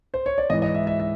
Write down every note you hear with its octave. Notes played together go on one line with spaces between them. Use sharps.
C5
C#5
D5
G#2 E3 D#5
D#5
E5
E5
E5